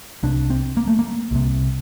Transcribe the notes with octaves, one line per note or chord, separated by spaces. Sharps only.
C2 C3 D4
C4
A#3
A3
A#3
C2 C3